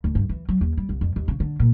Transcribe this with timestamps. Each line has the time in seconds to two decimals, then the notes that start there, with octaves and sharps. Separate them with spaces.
0.04 D2
0.15 G2
0.29 E3
0.49 F#3
0.61 D#2
0.77 G3
0.89 C2
1.01 F2
1.16 D#2
1.28 C#3
1.40 D3
1.60 A#2